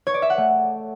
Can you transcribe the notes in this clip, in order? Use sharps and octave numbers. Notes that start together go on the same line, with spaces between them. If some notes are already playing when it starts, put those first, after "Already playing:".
C#5
D5
E5
F#5
A3